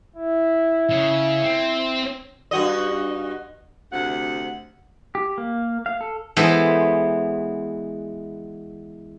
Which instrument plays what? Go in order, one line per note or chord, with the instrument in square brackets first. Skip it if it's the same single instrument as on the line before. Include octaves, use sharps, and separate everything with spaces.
[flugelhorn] E4
[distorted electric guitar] C#3
C4
[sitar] G2 F#4 D#5
[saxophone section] D2 C3 F#5
[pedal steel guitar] G4
A#3
F5
A4
[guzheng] E3 G#3 B3 A4 C5